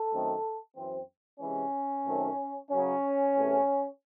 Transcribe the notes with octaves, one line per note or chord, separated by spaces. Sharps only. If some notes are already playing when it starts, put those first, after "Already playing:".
Already playing: A4
F#2 D#3 A3 C4
F#2 E3 C4
C3 E3 G#3 C#4
F#2 D#3 A3 C4
F#2 C#3 F#3 C#4
E2 C3 E3 A3